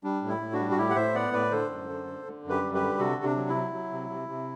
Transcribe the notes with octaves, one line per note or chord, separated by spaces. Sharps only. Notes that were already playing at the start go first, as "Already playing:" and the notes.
G3 D4
A2
E4
A2
D4 F#4
G3
F#4
A2 E4 G4
F#5
A2 C5 E5
B3 D5 F#5
A2 B4 D5
D3 A4 C5
F#2
D3
D3
D3
F#2
G4 B4
G3
G4 B4
D3
C3 F#4 A4
C3
D4
F#3
E4
F#3
F#3
C3
C3
C3